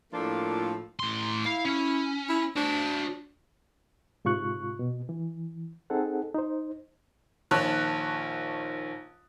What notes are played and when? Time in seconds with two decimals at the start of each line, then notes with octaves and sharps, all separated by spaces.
0.13 A2 F3 A#3 D4 F4 A4
1.00 A2 C6
1.46 E4 F5
1.65 C#4
2.29 E4
2.56 D4 F#4 C5
4.25 G#2 C3 F4 C#6 F#6
4.79 B2
5.09 E3
5.90 C4 D#4 G#4 A4 F#5
6.34 D#4 C5
7.51 A#1 D#3 C#5 A5 F#6